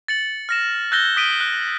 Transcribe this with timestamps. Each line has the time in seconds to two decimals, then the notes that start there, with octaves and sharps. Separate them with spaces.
0.08 A6 C#7 F#7
0.49 F6 A#6 E7
0.91 E6 F#6 G6 A6 A#6 G7
1.17 D#6 B6 D7 D#7 G7
1.40 F#6